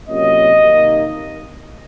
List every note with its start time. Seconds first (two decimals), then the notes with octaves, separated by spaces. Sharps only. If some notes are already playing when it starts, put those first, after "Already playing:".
0.09 C3 F#3 A#3 C#4 F4 D#5
0.62 C3 D#3 A#3 D#4